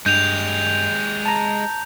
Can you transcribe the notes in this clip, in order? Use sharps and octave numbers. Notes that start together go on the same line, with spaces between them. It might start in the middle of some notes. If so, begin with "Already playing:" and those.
G2 G#3 G4 G6 F7
A5 A#5